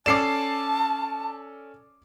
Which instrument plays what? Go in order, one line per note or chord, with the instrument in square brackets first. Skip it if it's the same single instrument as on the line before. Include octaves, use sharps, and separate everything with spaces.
[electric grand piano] C#4 A4 D5 [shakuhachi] A5 [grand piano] D6 C7 E7